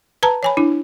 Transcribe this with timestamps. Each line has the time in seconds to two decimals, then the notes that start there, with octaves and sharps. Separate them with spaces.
0.23 B4 A5 A#5
0.43 C#5 G#5 B5
0.57 D4 E4